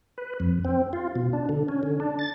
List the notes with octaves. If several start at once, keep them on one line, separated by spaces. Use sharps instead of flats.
B4
F2
C4
F4
B2
D4
D3
C#4
D3
D4
A6